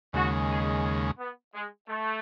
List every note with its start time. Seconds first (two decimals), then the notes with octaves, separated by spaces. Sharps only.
0.13 D#2 C#3 G#3 F#4
0.49 G#4
0.83 G#4
1.18 B3
1.53 G#3
1.88 A3